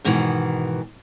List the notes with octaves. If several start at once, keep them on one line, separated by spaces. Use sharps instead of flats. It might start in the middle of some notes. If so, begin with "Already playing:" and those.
G#2 B2 D#3 E3